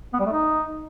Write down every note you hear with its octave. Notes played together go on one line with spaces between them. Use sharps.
B3
G3
A3
D#4